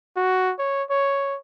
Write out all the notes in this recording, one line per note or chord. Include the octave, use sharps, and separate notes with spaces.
F#4
C#5
C#5